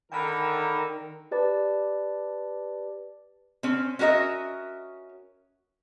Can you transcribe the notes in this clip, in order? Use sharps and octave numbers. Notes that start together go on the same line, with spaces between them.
D3 D#3 A#4 G5 B5
G4 B4 D5 A5
C4 C#4
C#4 F#4 A#4 D#5 E5